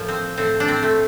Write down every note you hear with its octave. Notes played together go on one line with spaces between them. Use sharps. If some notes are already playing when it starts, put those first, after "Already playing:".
Already playing: A2 F3 A#3
C4
A2 C4
D4
C4
A3